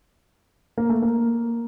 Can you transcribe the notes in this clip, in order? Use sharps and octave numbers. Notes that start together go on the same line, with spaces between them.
A#3
A3
A#3